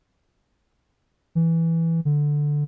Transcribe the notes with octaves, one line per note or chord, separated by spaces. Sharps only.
E3
D3